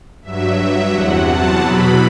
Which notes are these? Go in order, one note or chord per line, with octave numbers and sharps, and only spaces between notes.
G2 F#3 E5
E2 C3 F#3 F#5
A5
E2 B2 F#3 B5